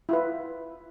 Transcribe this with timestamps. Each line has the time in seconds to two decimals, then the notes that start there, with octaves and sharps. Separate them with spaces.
0.09 E4 F4 B4